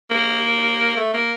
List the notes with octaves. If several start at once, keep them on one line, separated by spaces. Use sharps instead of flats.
A#3
A3
A#3